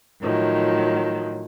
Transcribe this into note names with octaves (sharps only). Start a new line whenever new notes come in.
A2 D#3 F3 F#3